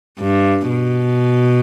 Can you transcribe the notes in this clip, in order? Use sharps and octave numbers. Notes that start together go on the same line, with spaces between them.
G2
B2